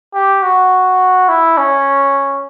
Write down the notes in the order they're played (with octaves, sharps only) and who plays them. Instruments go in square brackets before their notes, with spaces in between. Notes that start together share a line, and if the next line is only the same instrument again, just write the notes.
[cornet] G4
F#4
E4
C#4